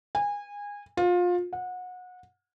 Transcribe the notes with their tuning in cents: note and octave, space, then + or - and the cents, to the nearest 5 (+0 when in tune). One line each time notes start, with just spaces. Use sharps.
G#5 -25
F4 +25
F#5 -25